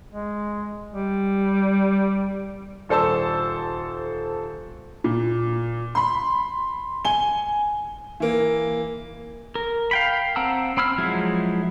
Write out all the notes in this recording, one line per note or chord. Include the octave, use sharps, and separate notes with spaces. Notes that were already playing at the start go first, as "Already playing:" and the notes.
G#3
G3
D#1 A4 C5 A5 E6
A#2
B5 C6
G#5 G7
E3 A#3
A#4
F5 G5 B5
C4 F#5 A5 A#5 E6
C4 B5 E6 F6
F3 F#3 G#3 E4